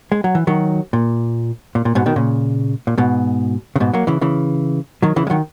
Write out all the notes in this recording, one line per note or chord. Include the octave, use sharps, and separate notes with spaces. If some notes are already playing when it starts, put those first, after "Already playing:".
G#3
F#3
E3
D#3 F#3
A#2
A#2
A#2
G#2 B2
B2 D#3
A#2 C#3
A#2
G#2 B2
C#3
G#2 B2
F#3 A#3
C#3 E3
C#3 E3
D#3 F#3
C#3 E3
G#3
D#3 F#3